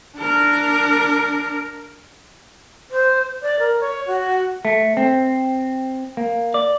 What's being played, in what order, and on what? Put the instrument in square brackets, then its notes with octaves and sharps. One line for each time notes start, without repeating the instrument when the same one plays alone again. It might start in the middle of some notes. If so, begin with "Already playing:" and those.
[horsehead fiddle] D4 A#4
[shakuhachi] C5
D5
A#4
C#5
F#4
[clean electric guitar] A3
C4
A#3
D5